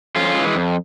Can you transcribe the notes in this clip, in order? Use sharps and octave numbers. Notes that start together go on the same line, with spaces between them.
F2 C#4 F4
E3 G#3
F2